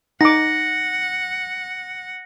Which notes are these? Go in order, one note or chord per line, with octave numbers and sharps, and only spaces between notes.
D#4 F#5 D6 A#6